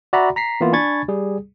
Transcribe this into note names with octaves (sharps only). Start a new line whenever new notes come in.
F#4 D5 E5 F#5 A#5 B5
A#5 B6 C7
E3 A#3 B3 E4 F4
D4 G#5 B5 C#6 G#6 A6
G3 G#4